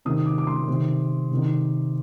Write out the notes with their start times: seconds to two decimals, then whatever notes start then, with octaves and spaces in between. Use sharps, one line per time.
0.05 C3 D#3 D#6
0.26 D6
0.38 D6
0.47 C6
0.68 C3 D#3
1.31 C3 D#3